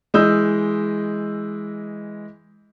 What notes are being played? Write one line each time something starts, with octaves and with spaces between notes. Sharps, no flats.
E3 G#3 D#5 D#6 E6 G6